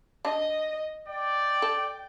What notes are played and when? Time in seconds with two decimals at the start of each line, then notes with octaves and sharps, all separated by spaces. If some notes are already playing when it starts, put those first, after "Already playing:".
0.25 D4 D#5 A5
1.08 D5 G5
1.62 A4